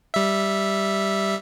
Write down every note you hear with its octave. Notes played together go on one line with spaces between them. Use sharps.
G3 E5